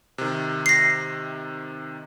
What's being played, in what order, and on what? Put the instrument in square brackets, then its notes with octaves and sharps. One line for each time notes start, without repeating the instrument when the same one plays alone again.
[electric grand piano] C3 D#3
[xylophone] A#6 C7